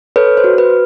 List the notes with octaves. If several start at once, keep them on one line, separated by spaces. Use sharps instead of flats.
A4 B4 C#5
C5
F#4
B4